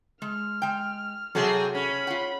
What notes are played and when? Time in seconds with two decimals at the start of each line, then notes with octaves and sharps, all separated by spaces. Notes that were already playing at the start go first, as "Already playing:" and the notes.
0.22 G#3 F6
0.62 G#3 G5
1.35 C3 F#3 C4 F#4 G#4 A4
1.75 C#4 B5
2.07 F4 F#5